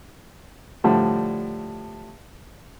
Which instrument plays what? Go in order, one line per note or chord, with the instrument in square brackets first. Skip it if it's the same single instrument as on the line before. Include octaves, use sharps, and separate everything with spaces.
[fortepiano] A2 D3 F3 G3